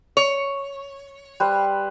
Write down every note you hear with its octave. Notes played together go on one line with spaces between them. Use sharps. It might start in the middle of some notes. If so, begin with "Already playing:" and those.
C#5
G3 B4 C5